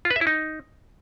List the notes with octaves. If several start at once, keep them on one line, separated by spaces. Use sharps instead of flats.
F4
B4
E5
E4
D#4